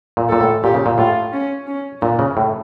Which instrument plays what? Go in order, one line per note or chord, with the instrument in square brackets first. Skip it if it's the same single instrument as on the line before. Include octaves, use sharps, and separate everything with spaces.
[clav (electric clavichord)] A#2
[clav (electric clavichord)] A#2 [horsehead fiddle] A4
[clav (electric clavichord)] A2
[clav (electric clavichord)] A#2 [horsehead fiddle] G4
[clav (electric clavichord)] C#3
A#2
[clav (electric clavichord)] A2 [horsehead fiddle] F4
[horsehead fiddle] C#4
C#4
[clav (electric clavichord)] A#2 [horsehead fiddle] D4
[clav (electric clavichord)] C#3
A2